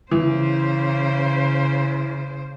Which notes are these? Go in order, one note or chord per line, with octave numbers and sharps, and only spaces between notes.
C#3 E3 C5